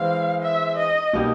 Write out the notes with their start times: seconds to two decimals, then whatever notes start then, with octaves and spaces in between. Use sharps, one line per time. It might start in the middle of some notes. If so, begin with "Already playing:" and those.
Already playing: E3 G#3 C4 F5
0.42 E5
0.78 D#5
1.13 B2 G3 A#3 D#4 G4